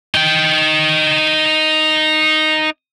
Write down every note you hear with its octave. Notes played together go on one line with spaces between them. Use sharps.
D#4 G5